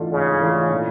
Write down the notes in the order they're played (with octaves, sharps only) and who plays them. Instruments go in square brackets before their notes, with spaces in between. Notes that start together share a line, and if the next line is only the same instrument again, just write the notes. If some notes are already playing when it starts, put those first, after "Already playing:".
Already playing: [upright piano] G#2 E3 A3 D4 F4
[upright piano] G#2 [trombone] C#3
[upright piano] E3 A3 D4 F4
A#2